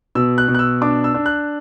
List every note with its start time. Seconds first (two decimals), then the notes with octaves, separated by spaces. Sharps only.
0.15 B2 E6
0.38 F#6
0.48 B2
0.55 F#6
0.59 E6
0.81 D4 D6
1.04 E6
1.14 D4
1.26 F#6